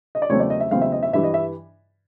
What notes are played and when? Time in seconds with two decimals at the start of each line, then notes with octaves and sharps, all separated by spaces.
0.15 D#5
0.22 D5
0.29 E2 C#3 F#3 A3 C4 C#5
0.40 D5
0.50 D#5
0.60 E5
0.71 E2 C#3 F#3 A3 C4 F5
0.82 E5
0.92 D#5
1.03 E5
1.13 G2 E3 G3 E5
1.24 D#5
1.34 E5